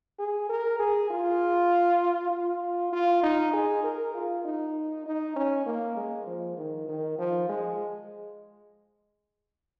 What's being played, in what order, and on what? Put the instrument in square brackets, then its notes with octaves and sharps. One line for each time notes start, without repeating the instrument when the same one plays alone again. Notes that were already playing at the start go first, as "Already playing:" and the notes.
[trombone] G#4
A#4
G#4
F4
F4
F4
D#4
G#4
A#4
F4
D#4
D#4
C#4
A#3
G#3
F3
D#3
D#3
F3
G#3